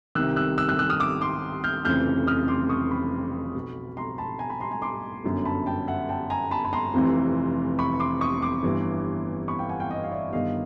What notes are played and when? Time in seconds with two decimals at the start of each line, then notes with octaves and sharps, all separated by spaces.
0.15 C2 C3 D#3 E6 F#6
0.36 E6 F#6
0.58 E6 F#6
0.69 E6 F#6
0.79 E6 F#6
0.90 D#6 F6
1.00 D6 E6
1.21 C6 D6
1.64 F6 G6
1.85 F1 F2 C#3 E3 F6 G6
2.27 D#6 F6
2.48 C6 D6
2.69 C#6 D#6
2.91 B5 C#6
3.55 B1 B2
3.97 A#5 C6
4.18 A5 B5
4.39 G#5 A#5
4.50 A5 B5
4.60 A#5 C6
4.71 G#5 A#5
4.82 C6 D6
5.24 G1 F#2 D3
5.45 A5 B5
5.66 G5 A5
5.88 E5 F#5
6.09 G5 A5
6.30 G#5 A#5
6.51 A5 B5
6.65 B5
6.73 A#5 C6
6.94 F1 F2 C3 E3
7.79 B5 C#6
8.00 C6 D6
8.21 C#6 D#6
8.42 C6 D6
8.63 G1 G2 E3
9.48 B5 C#6
9.59 F5 G5
9.69 F#5 G#5
9.80 F5 G5
9.90 D#5 F5
10.03 F5
10.12 D5 E5
10.33 G1 G2 D#3 D#5 F5